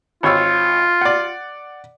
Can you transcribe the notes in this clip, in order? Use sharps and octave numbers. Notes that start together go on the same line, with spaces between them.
G#1 F4 C#5 E6
D5 F#5